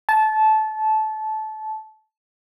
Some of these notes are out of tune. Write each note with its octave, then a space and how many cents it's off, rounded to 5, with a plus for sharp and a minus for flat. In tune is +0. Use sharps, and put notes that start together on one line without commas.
A5 -20